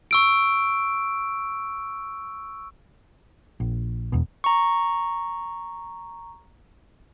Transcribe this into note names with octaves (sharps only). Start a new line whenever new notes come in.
C#6 E6 D7
A#1
E1 E2 B2
A#5 C#6